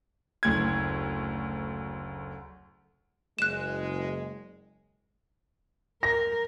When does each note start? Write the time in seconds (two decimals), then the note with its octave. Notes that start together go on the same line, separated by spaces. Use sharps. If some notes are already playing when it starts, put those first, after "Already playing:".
0.43 F#1 D2 G#6
3.39 F#1 G#3 F#6 E7
6.03 A#4 A#6